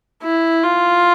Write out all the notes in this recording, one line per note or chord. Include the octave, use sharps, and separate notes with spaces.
E4
F4